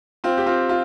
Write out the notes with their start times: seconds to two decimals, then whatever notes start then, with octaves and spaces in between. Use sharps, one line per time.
0.24 C4 F4
0.37 G4
0.46 C4 F4
0.69 F4